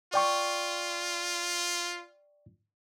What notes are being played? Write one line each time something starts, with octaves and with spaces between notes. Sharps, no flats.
F4 D5 G5 C#6